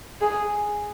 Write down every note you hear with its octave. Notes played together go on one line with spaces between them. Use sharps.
G#4